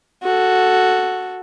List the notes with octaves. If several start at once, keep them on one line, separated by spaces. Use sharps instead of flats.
F#4 A4